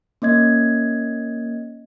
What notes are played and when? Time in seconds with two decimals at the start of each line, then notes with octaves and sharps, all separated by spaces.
0.22 A#3 C#4 D#5 G#6